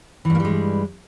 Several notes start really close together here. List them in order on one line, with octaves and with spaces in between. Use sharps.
E3 G2 A#3 G3 G#3